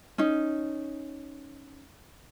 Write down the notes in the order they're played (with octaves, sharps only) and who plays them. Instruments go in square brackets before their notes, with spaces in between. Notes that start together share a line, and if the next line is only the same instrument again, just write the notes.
[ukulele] C#4 D#4